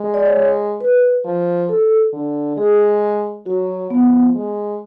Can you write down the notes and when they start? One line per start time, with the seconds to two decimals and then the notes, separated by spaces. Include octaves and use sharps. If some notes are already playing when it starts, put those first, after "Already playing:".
Already playing: G#3
0.14 D5
0.26 C#5
0.36 G#3
0.81 B4
1.25 F3
1.69 A4
2.13 D3
2.57 G#3 G#4
3.46 F#3 F#4
3.90 F3 B3
4.35 G#3